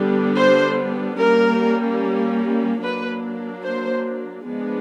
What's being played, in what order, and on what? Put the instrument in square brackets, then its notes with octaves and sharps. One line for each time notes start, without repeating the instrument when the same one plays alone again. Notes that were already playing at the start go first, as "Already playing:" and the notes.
Already playing: [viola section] D3 G3 B3 D4
C5
G3 A#3 C#4 A#4
F#3 A#3 D4 B4
C5
F3 G#3 B3 D4